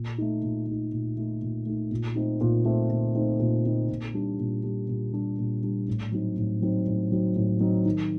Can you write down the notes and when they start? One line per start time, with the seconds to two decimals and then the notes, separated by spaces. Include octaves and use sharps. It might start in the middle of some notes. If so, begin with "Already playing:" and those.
Already playing: A#2
0.18 A3 D#4
0.42 A#2
0.67 A3 D#4
0.92 A#2
1.17 A3 D#4
1.42 A#2
1.66 A3 D#4
1.91 A#2
2.16 A3 C4 D#4
2.41 A#2
2.65 A3 C4 D#4
2.90 A#2
3.15 A3 C4 D#4
3.40 A#2
3.65 A3 C4 D#4
3.89 A#2
4.14 G3 D4
4.39 A#2
4.63 G3 D4
4.89 A#2
5.13 G3 D4
5.38 A#2
5.63 G3 D4
5.88 A2
6.12 F#3 C4 D#4
6.37 A2
6.62 F#3 C4 D#4
6.87 A2
7.11 F#3 C4 D#4
7.36 A2
7.60 F#3 C4 D#4
7.86 D#3